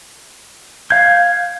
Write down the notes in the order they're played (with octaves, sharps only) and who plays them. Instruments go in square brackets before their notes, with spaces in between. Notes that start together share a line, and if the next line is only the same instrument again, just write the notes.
[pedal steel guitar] F5 G6 [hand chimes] G#6